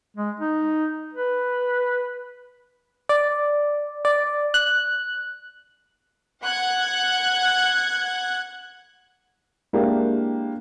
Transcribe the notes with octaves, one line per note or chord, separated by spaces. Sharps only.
G#3
D#4
B4
D5
D5
F#6
F#5 F#6 G#6
G#3 A#3 D4 E4 G4 A#4